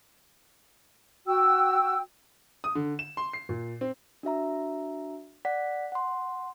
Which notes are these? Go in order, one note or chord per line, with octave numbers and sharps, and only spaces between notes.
F#4 G5 E6
D#6
D3
E7
C6
C7
A#2
C4
D4 F#4 E5 A#5
D5 F#5 B6
F#5 C6